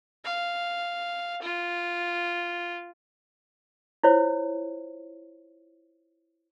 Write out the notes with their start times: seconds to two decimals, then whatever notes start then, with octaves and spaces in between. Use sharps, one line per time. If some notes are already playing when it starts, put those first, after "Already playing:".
0.25 F5
1.42 F4
4.04 E4 F4 C5 C#5